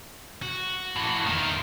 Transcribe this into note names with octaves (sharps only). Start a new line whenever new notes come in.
F#4
A2 E3
E2 D#3 F4